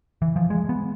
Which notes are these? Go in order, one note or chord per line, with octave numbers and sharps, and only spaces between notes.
E3
F3
G#3
B3